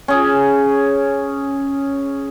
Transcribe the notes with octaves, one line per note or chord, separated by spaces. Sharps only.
C#4 G#4